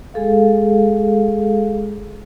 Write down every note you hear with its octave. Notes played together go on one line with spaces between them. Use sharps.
G#3 G#4 A4 F5